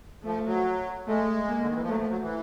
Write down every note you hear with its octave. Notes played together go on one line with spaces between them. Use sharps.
F3 A3
F#3
G#3 A3
A#3
D3
D#3
E3
F3
F#3 A3
F3
F#3
E3